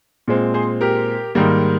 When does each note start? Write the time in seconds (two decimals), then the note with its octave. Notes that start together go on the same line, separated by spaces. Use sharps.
0.28 A#2 G#3 C4
0.54 G#4 C5
0.81 G4 A#4
1.35 G#2 D#3 G3 A#3